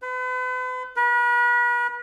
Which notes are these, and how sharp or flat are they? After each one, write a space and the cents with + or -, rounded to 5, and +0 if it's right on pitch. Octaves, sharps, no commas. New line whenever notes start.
B4 +40
B4 -40